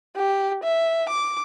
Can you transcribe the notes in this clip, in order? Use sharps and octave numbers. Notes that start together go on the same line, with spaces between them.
G4
E5
D6